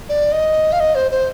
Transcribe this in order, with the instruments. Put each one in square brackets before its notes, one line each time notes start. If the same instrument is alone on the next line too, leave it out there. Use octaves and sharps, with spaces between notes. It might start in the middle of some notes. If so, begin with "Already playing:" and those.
[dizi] D5
D#5
F5
D#5
C5
C5